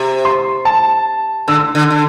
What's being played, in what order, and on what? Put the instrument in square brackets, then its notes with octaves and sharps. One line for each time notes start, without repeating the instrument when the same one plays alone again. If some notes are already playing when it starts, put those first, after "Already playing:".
Already playing: [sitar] C3
[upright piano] C6
A5
[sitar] D3 [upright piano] E6
[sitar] D3
D3